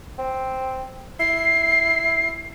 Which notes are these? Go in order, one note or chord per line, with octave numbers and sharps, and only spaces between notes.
C4
E4 C7